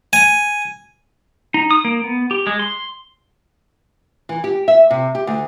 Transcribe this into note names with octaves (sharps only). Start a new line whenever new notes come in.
G#5
D#4
D#6
A#3
B3
G4
G#3
C6
E3
G4
E5
C3
G4
D2